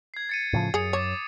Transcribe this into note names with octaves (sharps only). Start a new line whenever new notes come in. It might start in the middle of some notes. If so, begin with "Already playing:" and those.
G#6 C7
A6 C#7 D#7
A2 C#3 F3
F#2 G#4 D#6 C#7
C#5 D6 A6